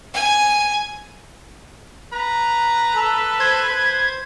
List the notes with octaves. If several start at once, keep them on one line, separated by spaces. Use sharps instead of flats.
G#5
B4 A#5
A4
C5 G#6
C5